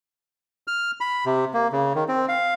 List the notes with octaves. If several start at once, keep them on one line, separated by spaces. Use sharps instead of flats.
F6
B5
C3
A#3
C#3
D#3
C4
F5